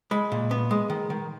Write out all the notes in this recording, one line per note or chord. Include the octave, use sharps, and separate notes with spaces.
G#3 B5
A#2
B3
G#3
D#3
D#3